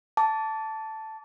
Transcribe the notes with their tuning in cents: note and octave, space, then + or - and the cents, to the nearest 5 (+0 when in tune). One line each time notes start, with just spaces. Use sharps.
A5 +0 D6 -35